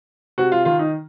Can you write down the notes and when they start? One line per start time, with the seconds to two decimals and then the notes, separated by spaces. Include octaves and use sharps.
0.38 C3 F#4
0.52 F4
0.65 D#3 F4
0.79 D#4